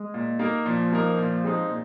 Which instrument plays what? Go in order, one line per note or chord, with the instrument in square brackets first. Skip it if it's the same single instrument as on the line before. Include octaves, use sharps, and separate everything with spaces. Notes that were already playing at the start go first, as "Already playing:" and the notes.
Already playing: [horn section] G#3
[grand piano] A#2
A#3 D#4 A#4
[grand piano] A#2 [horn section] F3
[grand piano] A#3 D#4 A#4
A#2
G#3 C4 D#4 G#4
A#2